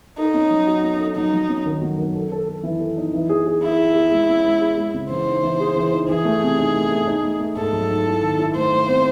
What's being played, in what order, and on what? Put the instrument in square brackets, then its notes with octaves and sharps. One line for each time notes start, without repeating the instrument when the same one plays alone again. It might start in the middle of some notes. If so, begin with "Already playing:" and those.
[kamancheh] D#4 [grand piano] A4
[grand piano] C#4
F#3
F#4
C#4
A4
[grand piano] F#3 [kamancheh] D#4
[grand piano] F#3
C#4
D#3
F#3
D#3
A4
A4
A4
E3
A4
D#4
E3
G#4
G#4
[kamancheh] E4 [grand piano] G#4
[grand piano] G#4
G#4
G#3
C#4
G#3
G#4
G#3
C#3
[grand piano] E3 [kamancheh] C5
[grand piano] D#4
E3
G#4
E3
D#4
[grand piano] E3 [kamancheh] G#4
[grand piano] A3
C3
D#4
A3
A3
D#4
A3
A3
[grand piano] G#2 [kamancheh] A4
[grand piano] F#3
D#4
E4
D#3
E4
[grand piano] A3 [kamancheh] C5
[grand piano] A3
C4